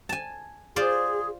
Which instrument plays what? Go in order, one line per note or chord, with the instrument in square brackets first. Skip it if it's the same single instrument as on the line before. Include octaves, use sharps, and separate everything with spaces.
[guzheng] G#5 A5
[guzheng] F4 C5 D5 [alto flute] G#4